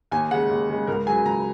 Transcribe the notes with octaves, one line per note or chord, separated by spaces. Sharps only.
D#2 G#5
C#3 G#3 F#5
D#2
C#3 G#3
C#2 A#4
C#3 F#3 G#5
C#2 A#5